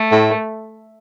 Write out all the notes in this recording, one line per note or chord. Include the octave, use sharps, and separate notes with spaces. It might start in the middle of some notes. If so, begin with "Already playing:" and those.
Already playing: A3
A2